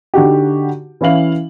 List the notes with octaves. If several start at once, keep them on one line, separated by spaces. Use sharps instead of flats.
D3 D#4 F#4 G4
E3 C#4 E4 E5 F5 F#7